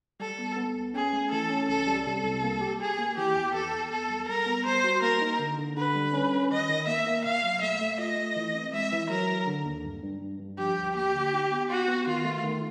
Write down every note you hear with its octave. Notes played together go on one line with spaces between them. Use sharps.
G3 A4
B3
B3
C#2
C#4 G#4
A3
E3 A4
C#4
C2 A4
G3
C3 A4
C2
A#3
G4
G4 G#4
A#3
E3 G4
E2
E2 A4
E2
B3 A4
G3
G3 A#4
B3
G3 C5
F#4
A#3 A#4
D#4
D3
D3
D3 B4
G3
C#4
C#4
D#3 D#5
D#3
A#3 E5
A#3
B2 F5
F#3
A3 E5
A3
F4 D#5
A3
E3
C4
G#3 E5
E3
F#3 A#4
F#3
D3
D#2
G2
G2
G2
G2
F3 G4
D2
A#3 G4
D3
D#4
B3
B3 F#4
B3
D#3 F4
A3
D#3